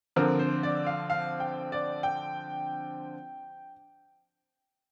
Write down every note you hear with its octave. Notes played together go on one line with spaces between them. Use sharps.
D3 F3 C4 A#4
C5
D5
F5
F5
G5
D5
G5